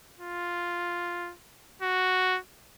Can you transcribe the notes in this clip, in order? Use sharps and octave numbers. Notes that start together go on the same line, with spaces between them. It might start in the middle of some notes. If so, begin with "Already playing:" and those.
F4
F#4